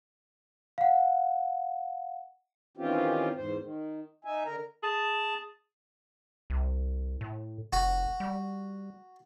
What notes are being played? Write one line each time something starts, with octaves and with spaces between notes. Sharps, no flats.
F5 F#5
D#3 E3 C4 C#4 F4 G4
E2 G#2 C5
D#3
D#4 E5 G#5
D3 A#4 A#5
G#4 A5
C2
A2
F1 F#4
G3